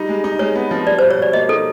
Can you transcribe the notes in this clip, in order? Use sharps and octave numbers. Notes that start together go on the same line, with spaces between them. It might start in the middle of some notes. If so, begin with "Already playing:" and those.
Already playing: G3 D#4
G#3
D#4
G#3 C#5
B3
F3
G3 D5
C5
B2
C#5
B2 D5
A#3 D#5
D#4 A4